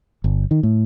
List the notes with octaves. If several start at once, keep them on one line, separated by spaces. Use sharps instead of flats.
G1
D#3
A2